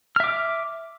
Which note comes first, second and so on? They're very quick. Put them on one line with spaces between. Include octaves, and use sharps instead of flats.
F6 E5 D6